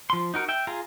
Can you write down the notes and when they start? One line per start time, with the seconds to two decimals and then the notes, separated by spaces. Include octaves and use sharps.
0.10 F3 C6
0.34 D#4 F#4 A#4
0.48 E5 G5
0.67 F4 G#4 A#5